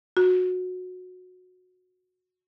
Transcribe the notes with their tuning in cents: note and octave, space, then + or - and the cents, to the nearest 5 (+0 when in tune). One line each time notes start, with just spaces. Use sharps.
F#4 -20